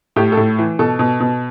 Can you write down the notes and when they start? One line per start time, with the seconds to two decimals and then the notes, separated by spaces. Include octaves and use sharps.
0.16 A2 G4
0.32 A4
0.37 A2
0.59 E3
0.79 B2 A4
0.99 B2
1.20 B2